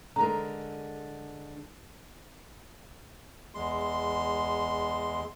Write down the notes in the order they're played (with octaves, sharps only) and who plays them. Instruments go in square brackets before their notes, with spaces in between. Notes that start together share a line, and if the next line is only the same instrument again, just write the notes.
[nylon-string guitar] D3 G#3 A#4 [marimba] A#5
[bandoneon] E2 G#3 C6